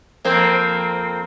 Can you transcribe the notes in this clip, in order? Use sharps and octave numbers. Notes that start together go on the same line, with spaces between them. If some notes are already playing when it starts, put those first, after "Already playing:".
F2 A#3 C4